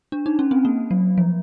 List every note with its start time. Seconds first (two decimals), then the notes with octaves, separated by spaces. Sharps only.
0.12 D4
0.26 D#4
0.39 C#4
0.51 C4
0.65 A#3
0.91 F#3
1.18 F3